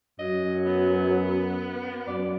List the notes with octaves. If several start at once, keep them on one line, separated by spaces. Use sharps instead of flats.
F#2 F#3 D#5
B3
F#2 D5